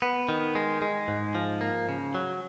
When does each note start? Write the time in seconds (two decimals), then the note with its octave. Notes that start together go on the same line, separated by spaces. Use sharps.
0.02 B3
0.29 D#3
0.55 G#3
0.82 G#3
1.08 G#2
1.35 F3
1.61 A#3
1.89 C#3
2.15 F#3